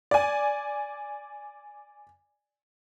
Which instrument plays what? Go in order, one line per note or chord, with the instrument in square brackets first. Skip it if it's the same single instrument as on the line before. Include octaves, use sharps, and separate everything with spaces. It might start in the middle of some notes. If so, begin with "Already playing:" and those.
[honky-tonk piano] D5 G#5